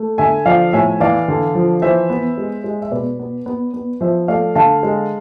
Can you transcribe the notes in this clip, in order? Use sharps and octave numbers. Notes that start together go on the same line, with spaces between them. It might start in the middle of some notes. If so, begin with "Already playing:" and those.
Already playing: A3
D3 E5 G#5
F3 D5 F5
A2 E5 G#5
E3 D5 F5
D3
F3
E3 C5 E5
B3
G#3
G#3
E5
B2 B4 D5
B3
B3
B3
F3 C5 E5
A3 D5 F5
D3 F5 A5
G#3